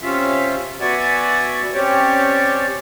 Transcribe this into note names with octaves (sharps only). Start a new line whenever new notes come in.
C3 C#4 F4 E5
B3 F#4 D5 E5 F#5 G#5
C4 C#4 G4 C#5 D5